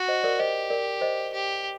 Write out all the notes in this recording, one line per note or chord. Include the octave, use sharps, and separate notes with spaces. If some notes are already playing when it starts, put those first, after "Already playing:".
Already playing: F#4
C5 D#5
A#4 D5
G4 C5 D#5
A#4 D5
C5 D#5
G4